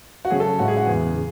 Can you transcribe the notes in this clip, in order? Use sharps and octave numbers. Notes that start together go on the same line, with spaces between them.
F#4
C#3 F#3 A3 C#4 G#4
A4
A2 G#3 C#4 F#4
G#4
F#4
E2 C#3 E3 G#4
C#3